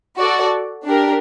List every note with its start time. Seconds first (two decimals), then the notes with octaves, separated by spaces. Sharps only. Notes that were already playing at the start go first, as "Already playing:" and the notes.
0.19 F#4 A4 D5
0.86 D4 G4 A#4